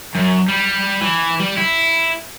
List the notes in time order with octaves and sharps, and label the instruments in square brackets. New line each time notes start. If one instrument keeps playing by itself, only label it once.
[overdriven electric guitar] F#2
G3
E3
G3
E4